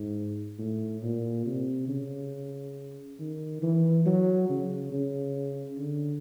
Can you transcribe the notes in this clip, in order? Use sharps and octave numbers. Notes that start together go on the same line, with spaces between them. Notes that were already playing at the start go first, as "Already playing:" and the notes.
Already playing: G#2
A2
A#2
C3
C#3
D#3
E3
F#3
C#3
C#3
D3